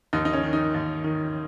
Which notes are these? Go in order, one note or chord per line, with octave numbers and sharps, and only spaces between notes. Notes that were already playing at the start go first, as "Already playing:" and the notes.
D#2 D#4
D#4
C#4
D#3
D#4
D#2
D#3